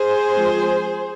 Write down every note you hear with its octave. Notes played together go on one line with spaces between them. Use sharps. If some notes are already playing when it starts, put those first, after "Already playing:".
Already playing: G#4 C5
F3 G#3 C4